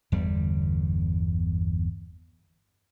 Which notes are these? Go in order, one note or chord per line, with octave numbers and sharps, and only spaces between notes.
G1 E2 D3 G3